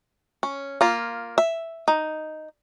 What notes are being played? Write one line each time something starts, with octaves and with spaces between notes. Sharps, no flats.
C#4
A#3 F4
E5
D#4